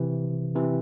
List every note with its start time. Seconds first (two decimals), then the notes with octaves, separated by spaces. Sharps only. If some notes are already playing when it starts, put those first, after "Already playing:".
Already playing: C3 E3
0.55 C3 E3